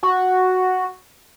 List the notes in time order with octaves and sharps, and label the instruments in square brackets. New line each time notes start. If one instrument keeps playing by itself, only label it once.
[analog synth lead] F#4